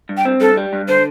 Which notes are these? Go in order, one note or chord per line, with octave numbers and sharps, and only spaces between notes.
G2
G5
C4
G2 A4
G3
G2
D3 C5